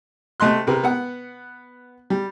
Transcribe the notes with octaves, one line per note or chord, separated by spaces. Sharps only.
C3 A3 D#5 C6 F#6
C3 A#4 B4
B3 F#5
G3